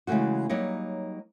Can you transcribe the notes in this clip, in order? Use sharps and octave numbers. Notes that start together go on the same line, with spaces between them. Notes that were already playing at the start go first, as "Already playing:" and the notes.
C#3 E3 G#3 A3 F#4
F#3 G3 A#3 D#4 C#5